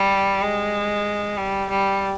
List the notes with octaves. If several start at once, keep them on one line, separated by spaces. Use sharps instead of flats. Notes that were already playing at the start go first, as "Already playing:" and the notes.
Already playing: G3
G#3
G3
G3